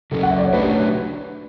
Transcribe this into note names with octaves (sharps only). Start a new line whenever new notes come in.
C#3 F#3 C#4 A4
F#5
E5
D5
C#5
F#3 A3 D4 G4 B4